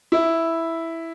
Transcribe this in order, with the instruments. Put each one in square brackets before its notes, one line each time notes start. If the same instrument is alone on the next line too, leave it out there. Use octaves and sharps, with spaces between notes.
[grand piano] E4